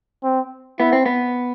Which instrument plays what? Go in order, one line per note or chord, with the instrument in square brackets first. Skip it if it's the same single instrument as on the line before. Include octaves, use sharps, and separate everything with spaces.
[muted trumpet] C4
[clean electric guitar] B3 [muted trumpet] E4
[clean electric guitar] C4
B3